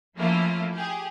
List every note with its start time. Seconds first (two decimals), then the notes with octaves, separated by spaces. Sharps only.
0.18 F3 A3 A#3 C#4 E4 F4
0.73 G4 G#4